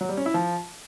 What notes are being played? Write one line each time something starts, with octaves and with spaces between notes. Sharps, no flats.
F#3
G3
C#4
E4
F3